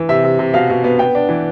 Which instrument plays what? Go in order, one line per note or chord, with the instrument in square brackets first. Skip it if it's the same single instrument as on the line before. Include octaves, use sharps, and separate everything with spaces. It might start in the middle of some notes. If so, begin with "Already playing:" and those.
Already playing: [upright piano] E3
C3 E5
C3
C3
B2 F5
B2
B3
B3 G5
D4
E3